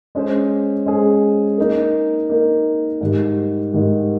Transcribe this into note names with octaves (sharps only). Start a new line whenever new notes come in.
G#3 C#4 G#4 C5
G#3 C#4 G#4 C5
A#3 D#4 A#4
A#3 D#4 A#4
G#2 D#3 G3
G#2 D#3 G3